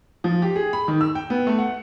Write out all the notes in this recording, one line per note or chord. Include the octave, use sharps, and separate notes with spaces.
F3
G4
G#4
B5
D#3
E6
G5
B3
A3
F#5